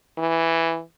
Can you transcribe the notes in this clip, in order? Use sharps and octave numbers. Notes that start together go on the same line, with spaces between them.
E3